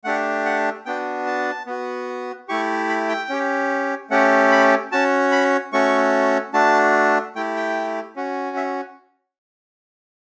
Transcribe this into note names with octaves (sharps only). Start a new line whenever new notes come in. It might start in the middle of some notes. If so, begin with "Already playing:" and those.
A3 D4 G4 F#5
F#5
B3 D4 F#4 G5
A5
B3 F#4
A3 E4 G4 C#6
B5
G5
C#4 G4
A3 C#4 G4 F#5
B5
C#4 F#4 A5
B5
A3 C#4 F#4 C#6
A3 D4 F#4 A5
A3 E4 G4 G5
G5
C#4 F#4
E5